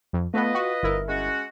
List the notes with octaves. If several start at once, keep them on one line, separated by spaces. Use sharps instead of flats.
F2
A3 B3 F4 B4 D#5
F#4
G1 E4 A#4
G#3 C#4 F#4